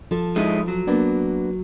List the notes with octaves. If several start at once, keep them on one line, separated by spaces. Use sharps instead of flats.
F3 A4
G#3 D#4 E4
F#3
A#3 B3 D4